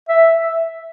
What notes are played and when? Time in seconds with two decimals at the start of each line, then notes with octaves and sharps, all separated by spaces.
0.09 E5